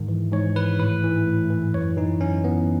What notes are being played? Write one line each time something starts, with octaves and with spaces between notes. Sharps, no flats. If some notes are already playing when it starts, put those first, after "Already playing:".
Already playing: G#2 D#3
E3
G#2 C#5
E3 B4
A2 B4
E3
A2
E3
F#2 C#5
E3 D#4
F#2 C#4
E3 B3